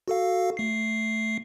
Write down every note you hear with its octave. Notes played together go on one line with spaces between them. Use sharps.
F#4 A4 F5
A3 C7